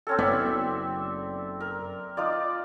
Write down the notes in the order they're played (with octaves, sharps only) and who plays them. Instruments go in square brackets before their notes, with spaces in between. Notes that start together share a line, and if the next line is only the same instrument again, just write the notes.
[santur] C4 C#4 A4
[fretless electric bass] F#1 B3 [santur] D5 E5
[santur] A#4
D#4 F4 D5